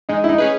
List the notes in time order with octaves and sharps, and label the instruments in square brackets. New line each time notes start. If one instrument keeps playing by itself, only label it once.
[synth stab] G#3 [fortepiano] D#4
[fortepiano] E4
D#4
[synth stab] C#4 G#4 B4